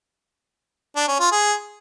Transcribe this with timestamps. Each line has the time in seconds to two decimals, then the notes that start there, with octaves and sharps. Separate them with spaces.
0.96 D4
1.08 C#4
1.20 F4
1.32 G#4